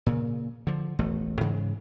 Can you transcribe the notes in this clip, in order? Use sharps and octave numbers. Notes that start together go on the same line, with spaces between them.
A#2 C#3
D3 F3
E1 A1 A3
G#2 C#3 E3 G#3